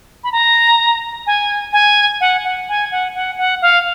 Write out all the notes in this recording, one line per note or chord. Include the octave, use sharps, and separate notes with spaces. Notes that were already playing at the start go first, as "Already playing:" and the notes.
B5
A#5
G#5
G#5
F#5
F#5
G#5
F#5
F#5
F#5
F5